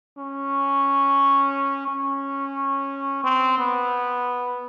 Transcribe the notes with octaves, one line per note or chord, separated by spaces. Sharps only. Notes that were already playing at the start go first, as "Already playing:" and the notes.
C#4
C#4
C4
B3